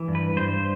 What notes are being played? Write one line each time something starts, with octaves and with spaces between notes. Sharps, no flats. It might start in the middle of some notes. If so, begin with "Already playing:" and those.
Already playing: E3
G2
B4
G2 C5